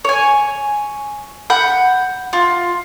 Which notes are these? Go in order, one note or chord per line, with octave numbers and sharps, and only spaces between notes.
C#5 G#5
F#5 B5 G6
F4